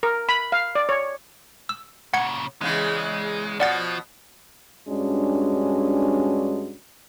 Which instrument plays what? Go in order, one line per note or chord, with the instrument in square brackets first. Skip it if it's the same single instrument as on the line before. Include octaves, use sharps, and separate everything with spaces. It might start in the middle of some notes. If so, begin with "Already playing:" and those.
[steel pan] A#4
B5
F5
D5
C#5
[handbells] E6
[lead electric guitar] A#2 C#3 [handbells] F#5 G#6 C#7
[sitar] E2 C#3 E3 [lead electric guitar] G#3
[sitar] B2 [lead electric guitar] F3 [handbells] D5 F#5 A6
[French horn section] G2 G#3 C#4 D4 F#4